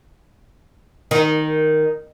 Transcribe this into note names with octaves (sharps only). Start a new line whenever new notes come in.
D#3